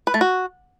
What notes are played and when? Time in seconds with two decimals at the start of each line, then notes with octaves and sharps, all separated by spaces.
0.07 B4
0.14 A3
0.21 F#4